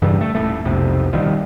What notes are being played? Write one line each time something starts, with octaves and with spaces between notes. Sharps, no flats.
G2 C#3 E3 G3
A3
D#1 A2 A3
B1 F2 C3
A#1 D#3 F3 G3